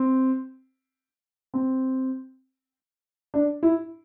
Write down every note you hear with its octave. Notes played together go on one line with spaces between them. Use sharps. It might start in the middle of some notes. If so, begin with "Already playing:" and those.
Already playing: C4
C4
D4
E4